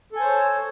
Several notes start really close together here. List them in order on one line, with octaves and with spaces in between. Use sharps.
A4 G#5 C5 C#5 A5